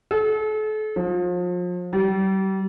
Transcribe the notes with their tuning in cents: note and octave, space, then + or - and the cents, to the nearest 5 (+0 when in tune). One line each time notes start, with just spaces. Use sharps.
A4 -40
F3 +35
G3 -35